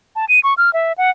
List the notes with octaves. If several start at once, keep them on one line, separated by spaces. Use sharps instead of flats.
A5
D#7
C#6
F6
E5
F#5